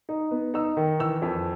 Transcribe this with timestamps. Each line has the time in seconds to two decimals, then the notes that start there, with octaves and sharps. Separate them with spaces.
0.09 D#4
0.31 B3
0.54 D#4 E6
0.77 D#3
0.99 E3 E6
1.22 F2